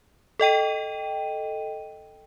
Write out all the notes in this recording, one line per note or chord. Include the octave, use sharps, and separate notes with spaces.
A4 D#5 G5 D#7